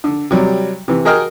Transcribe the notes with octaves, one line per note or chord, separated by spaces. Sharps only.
D3
C3 F#3 G3
C3 E3
F#4 G#4 A#4 D#5 G5 F6